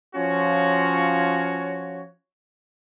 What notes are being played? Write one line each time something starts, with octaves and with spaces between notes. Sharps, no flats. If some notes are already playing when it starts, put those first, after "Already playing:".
F3 C#4 F4 F#4 C#5